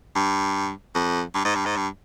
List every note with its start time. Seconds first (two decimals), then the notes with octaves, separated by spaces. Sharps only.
0.15 G2
0.95 F2
1.34 G2
1.45 G#2
1.55 G2
1.66 G#2
1.76 G2